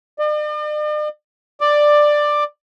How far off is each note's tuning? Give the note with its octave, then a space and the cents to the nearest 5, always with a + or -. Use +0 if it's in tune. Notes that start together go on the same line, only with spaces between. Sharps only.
D5 +45
D5 +10